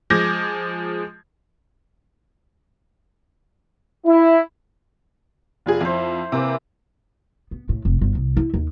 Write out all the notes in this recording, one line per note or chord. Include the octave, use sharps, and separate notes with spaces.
F3 G#3 D6 G6 G#6 A#6
E4
F1 F4 G#4
F2 E4 C5
C3 E3 A#3 C5
B3
A2
F1
G1
C2
E4
D#2